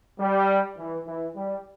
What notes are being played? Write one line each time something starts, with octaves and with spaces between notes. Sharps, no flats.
G3
E3
E3
G3